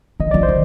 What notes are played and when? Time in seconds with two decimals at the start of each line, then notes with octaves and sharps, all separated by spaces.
0.20 D#3 D#5
0.31 F3 D5
0.43 C5
0.48 D#3